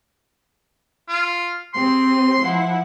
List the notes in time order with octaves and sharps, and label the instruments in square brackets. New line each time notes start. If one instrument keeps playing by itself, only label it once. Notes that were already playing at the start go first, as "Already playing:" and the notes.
[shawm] F4
[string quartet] C4 G4 G#4 [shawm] C6
[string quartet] F3 E4 F#5